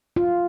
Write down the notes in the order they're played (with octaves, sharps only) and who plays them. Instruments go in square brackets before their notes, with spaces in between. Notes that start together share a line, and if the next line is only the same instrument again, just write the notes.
[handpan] F4